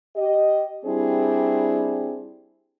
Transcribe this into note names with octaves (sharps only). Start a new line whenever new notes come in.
G4 D#5
G3 C4 D4 E4 G4 G#4